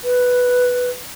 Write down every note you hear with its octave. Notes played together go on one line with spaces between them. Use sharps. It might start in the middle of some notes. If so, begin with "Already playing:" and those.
B4